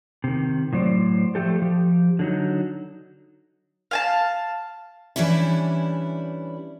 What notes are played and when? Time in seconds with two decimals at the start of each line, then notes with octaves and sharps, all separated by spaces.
0.24 C3 D#3
0.73 A2 F#3 C5 D5
1.35 F3 A3 G4 A4
1.62 F3 G4
2.19 D3 F#3 D#4
3.91 F5 G#5 A5
5.16 E3 G3 C#4 D4 E4